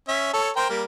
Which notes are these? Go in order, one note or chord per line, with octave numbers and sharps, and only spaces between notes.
C#4 E5
A4 C#5
A#4 C5 G5
G3 A#3